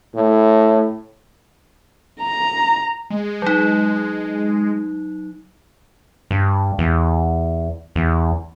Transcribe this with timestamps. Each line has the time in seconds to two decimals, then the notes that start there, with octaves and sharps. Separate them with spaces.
0.15 A2
2.21 A#5
3.10 G#3
3.42 F#3 D#4
6.31 G2
6.79 E2
7.96 E2